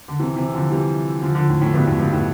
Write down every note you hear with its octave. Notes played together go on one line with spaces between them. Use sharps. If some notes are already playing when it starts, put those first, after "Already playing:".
D3
C3 E3
C3 E3
D3 F3
E3 G3
D3 F3
D3 F3
A2
A2
G2 B2
A2
G2
A2